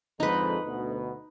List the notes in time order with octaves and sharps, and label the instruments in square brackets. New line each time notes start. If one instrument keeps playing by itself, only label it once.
[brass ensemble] F2 G#2 D3 [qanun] D#4 B4
[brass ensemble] D2 B2